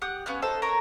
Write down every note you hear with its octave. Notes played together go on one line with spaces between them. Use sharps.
G4 F#5 D#6 F#6
B3 C#4 F5 F#6
D#4 A4 C5
A4 A#4 C#5 A#5